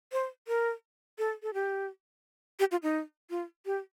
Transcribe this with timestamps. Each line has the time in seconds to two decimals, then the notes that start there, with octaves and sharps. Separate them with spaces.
0.12 C5
0.48 A#4
1.18 A4
1.43 A4
1.54 G4
2.59 G4
2.71 F4
2.83 D#4
3.30 F4
3.66 G4